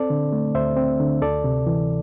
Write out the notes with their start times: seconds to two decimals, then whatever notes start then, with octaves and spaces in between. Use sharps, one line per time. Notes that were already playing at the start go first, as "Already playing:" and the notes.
Already playing: C4 A4 D5
0.10 D3
0.33 A3
0.55 D2 C5 E5
0.77 C4
1.00 D3
1.22 D2 A4 D5
1.44 C3
1.67 E3